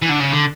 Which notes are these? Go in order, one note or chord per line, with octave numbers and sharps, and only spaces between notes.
E3
D3
C#3
D3